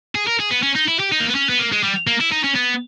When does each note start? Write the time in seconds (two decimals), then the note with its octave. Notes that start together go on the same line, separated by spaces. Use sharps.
0.15 G#4
0.27 A#4
0.40 G#4
0.51 B3
0.63 C#4
0.75 D#4
0.88 E4
1.00 G4
1.12 D#4
1.20 A#3
1.28 B3
1.35 C#4
1.49 B3
1.59 A#3
1.72 G#3
1.83 G3
2.07 A#3
2.20 E4
2.32 D#4
2.44 C#4
2.55 B3